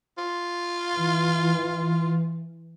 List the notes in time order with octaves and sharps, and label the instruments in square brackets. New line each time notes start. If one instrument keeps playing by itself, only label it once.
[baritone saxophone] F4
[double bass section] E3